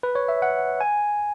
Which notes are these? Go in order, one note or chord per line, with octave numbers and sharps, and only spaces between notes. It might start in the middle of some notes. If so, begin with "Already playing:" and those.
B4
C#5
E5
F#5
G#5